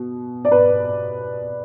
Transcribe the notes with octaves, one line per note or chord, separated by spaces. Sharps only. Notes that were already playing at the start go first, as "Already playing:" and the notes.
Already playing: B2
D5
B4